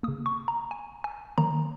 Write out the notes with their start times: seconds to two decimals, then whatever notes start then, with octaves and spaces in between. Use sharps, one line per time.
0.03 C#3 A#3 D#6
0.26 C#6
0.48 A#5
0.71 G#5
1.04 G#5
1.38 D#3 F#3 A#3 A#5